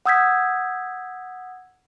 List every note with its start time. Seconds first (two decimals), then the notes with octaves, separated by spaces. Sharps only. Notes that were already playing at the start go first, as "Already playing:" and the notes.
0.05 F#5 D#6 E6 G6 G#6 B6